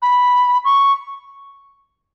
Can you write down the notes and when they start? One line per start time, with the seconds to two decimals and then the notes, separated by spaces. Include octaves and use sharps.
0.02 B5
0.65 C#6